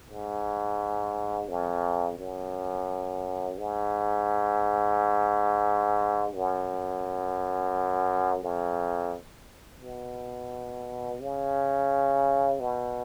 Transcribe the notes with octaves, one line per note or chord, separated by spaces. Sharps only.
G#2
F2
F#2
G#2
F#2
F2
B2
C#3
B2